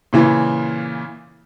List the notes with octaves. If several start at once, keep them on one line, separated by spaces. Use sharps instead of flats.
A#2 C#3 E3